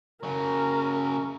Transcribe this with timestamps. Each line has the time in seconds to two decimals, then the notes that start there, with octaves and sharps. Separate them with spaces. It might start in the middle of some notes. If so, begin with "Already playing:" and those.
0.23 C#3 F#3 A#4